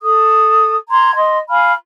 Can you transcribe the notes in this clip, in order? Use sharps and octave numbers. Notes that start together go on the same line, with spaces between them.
A4 D#6
A#5 C6 G#6
D#5 C6
F5 G#5 B5 F6